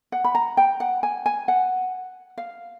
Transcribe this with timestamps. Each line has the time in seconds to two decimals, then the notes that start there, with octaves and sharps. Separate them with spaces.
0.12 F#5
0.24 B5
0.35 A#5
0.57 G5
0.80 F#5
1.03 G#5
1.26 G#5
1.48 F#5
2.38 F5